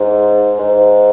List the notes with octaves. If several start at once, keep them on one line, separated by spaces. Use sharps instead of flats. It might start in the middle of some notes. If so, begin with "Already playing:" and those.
Already playing: G#2
G#2